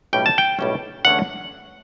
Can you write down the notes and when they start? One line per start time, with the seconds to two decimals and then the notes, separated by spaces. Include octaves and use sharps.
0.13 B1 A2 G3 C#4 G5
0.26 A5
0.38 G5
0.59 B1 A2 G3 C#4
1.05 E2 D3 A3 C#4 F#5